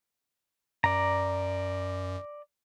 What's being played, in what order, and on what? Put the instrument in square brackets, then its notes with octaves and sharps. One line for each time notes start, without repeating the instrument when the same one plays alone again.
[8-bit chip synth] F#2 [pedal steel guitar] D5 A#5